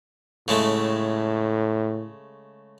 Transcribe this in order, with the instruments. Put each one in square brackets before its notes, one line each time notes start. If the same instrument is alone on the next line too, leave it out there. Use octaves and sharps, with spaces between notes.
[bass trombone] A2 [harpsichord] C#3 G#3 A3